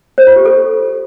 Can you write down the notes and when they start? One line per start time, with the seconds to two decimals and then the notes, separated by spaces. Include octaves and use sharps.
0.18 C5
0.27 F4
0.36 G4
0.45 A4